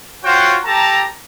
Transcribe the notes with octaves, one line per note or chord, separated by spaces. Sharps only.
F4 F#4 C5 C#5 F#5 G5
G4 A4 A5 A#5